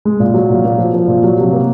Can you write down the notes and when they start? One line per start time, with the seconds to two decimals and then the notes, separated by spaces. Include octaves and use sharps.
0.05 G#3
0.20 A#2
0.34 F#3
0.50 A#2
0.64 A#3
0.78 F3
0.94 F3
1.08 A#2
1.24 F#3
1.37 C3
1.53 A#3